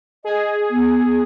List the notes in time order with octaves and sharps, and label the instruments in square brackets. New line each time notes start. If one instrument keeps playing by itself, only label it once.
[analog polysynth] G#4 [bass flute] D#5
[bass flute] B3